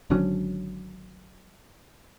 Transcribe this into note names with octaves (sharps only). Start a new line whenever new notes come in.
G#1 D3 F#3 C#4